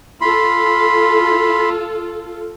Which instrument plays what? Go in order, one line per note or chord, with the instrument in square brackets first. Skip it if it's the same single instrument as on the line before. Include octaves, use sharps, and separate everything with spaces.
[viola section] F4 A4 [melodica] B5 C6